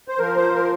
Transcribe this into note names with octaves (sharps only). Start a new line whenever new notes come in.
C5
F3 A#4
C5
F3 A#4